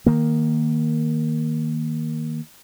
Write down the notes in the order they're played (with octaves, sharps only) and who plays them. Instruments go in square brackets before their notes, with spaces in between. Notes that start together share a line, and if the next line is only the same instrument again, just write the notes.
[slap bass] D#3 A#3